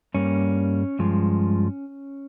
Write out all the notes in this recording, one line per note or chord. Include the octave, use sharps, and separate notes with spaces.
G2 G3 A#3 C#4
G2 F3 G#3